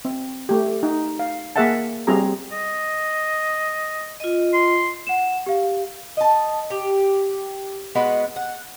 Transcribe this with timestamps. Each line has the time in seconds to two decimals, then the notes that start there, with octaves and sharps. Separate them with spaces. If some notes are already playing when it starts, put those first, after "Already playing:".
0.05 C4
0.49 A3 G4
0.83 D#4
1.19 F5
1.56 A#3 G#4 A#4 E5 F#5 A5
2.07 G3 C4 F#4 G#4 A#5
2.52 D#5
4.20 F4 D#5
4.53 C6
5.07 F#5 E7
5.46 G4 F5
6.17 D#5 A5
6.70 G4
7.95 G#3 B3 F#4 B4
8.36 F#5